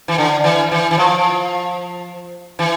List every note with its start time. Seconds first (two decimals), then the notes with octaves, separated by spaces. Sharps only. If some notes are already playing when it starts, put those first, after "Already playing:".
0.08 E3
0.18 D3
0.44 E3
0.72 E3
0.91 E3
0.98 F3
2.59 E3